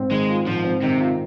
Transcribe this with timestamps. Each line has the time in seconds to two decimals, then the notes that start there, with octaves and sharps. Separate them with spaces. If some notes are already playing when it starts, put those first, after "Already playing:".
Already playing: G#2 C4
0.11 D#3 G#3
0.29 F4
0.47 G#2 F3
0.64 C4
0.82 C3 D#3
1.00 F4